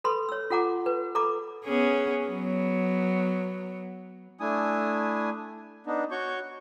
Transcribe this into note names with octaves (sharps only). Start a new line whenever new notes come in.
A4 B4 B5 C6 D#6
C#5 E6
F4 A4 F#5 A#5 D6
B4
A4 A#5 B5 D6
B3 C#4 G#4
F#3 B3
A3 D4 E4 G#5 D#6
B3 D4 D#4
F#4 C#5 C#6 G6